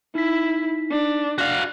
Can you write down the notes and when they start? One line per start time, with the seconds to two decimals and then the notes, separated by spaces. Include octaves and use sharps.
0.15 D#4 E4 B6
0.91 D4
1.38 F#4 F5